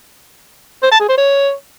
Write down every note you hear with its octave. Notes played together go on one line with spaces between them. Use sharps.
C5
A5
G#4
C5
C#5